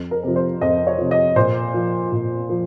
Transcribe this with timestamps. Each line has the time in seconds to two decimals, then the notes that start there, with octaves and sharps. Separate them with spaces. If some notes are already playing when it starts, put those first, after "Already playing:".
Already playing: F2
0.11 A#4
0.23 C3 F3
0.36 C5
0.61 F2 D#5
0.87 C#5
0.98 C3 F3
1.11 D#5
1.36 A#2 C5
1.74 F3
2.12 A#2
2.50 F3